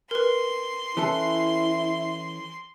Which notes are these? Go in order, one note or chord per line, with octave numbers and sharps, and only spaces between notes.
A#4 B4 C6
E3 C#4 E4 A4